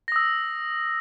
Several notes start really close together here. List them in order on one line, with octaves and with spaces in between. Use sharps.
A#6 D#6 E6